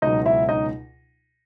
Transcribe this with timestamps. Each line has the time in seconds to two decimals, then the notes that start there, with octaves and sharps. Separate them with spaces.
0.02 C#2 B2 F#3 D#4 D#5
0.26 E4 E5
0.49 D#4 D#5